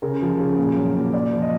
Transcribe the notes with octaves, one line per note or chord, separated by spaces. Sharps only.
C#3 A#4
F3
C#3
A#2
F#3
A#2
A#2 D5
F3
D#5